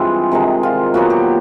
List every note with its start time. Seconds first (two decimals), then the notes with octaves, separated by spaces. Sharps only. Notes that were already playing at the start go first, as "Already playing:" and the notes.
Already playing: G2 E3 G#3 C4 F4
0.32 C3 D#3 G#3
0.63 F4
0.94 A#2 F#3 B3 F#4
1.10 G4